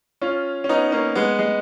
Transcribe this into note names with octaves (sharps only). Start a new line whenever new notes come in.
C#4 F4
C#4
B3 D#4
A#3 C#4
G#3 B3
G#3